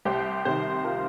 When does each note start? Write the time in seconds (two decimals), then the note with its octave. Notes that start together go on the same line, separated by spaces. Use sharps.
0.05 C2 G4 C5
0.45 C3 D#3 G4 C5
0.84 F4 A#4